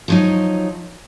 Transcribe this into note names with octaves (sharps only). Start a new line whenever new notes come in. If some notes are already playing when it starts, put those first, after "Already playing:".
F3 F#3 D#4